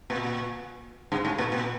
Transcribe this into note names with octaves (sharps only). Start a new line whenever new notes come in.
A#2
G2
G#2
A#2
A#2